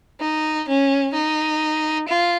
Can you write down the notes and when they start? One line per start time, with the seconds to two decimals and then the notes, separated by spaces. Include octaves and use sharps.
0.21 D#4
0.68 C#4
1.14 D#4
2.08 F4